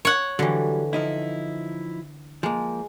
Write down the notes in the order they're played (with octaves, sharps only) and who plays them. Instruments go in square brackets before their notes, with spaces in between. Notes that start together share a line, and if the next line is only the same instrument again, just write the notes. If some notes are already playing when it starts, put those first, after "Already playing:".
[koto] C#5 F#5
[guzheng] D3 E3 [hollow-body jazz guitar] F#3 G3
[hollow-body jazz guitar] F3 D#4 E4
[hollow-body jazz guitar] F3 A#3 [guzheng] G#3